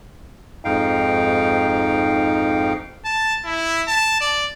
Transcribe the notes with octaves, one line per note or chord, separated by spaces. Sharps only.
F2 G#2 D#4 F5 G5
A5
E4
A5
D5